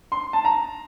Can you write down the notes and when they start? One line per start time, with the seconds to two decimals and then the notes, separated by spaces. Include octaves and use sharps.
0.12 C6
0.33 A5
0.45 A#5